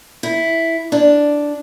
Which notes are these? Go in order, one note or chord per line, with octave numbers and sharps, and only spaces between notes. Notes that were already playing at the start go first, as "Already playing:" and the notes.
E4
D4